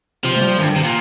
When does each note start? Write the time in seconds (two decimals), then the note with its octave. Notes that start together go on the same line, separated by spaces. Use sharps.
0.24 C3 F3
0.36 A3
0.41 G3
0.58 G2 D#3
0.67 D3
0.75 C3 D#3
0.84 A#2